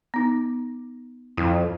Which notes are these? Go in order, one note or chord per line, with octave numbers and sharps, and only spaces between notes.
B3 D#4
F2 E4